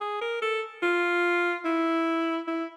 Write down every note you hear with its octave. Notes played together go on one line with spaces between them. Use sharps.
G#4
A#4
A4
F4
E4
E4